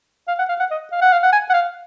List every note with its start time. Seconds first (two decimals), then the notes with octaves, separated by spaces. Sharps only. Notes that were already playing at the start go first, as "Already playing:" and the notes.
0.28 F5
0.39 F#5
0.49 F5
0.59 F#5
0.71 D#5
0.92 F5
1.02 F#5
1.12 F5
1.23 F#5
1.33 G#5
1.50 F#5
1.53 F5